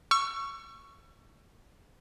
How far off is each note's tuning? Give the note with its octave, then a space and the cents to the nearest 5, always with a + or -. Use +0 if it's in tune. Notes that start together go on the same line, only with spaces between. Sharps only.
C#6 +0 E6 +35